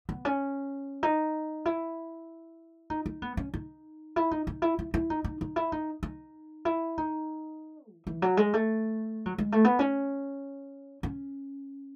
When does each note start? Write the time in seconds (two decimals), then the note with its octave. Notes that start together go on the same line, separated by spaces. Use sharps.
0.09 B3
0.25 C#4
1.03 D#4
1.66 E4
2.90 D#4
3.06 D#4
3.22 B3
3.37 C#4
3.54 D#4
4.16 E4
4.31 D#4
4.47 D#4
4.62 E4
4.79 E4
4.94 E4
5.10 D#4
5.24 D#4
5.41 D#4
5.56 E4
5.72 D#4
6.03 D#4
6.65 E4
6.98 D#4
7.90 E3
8.07 E3
8.22 F#3
8.37 G#3
8.54 A3
9.26 F#3
9.38 G#3
9.52 A3
9.65 B3
9.79 C#4
11.03 C#4